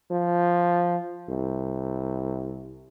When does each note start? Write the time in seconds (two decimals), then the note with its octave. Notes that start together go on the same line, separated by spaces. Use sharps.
0.11 F3
1.29 C2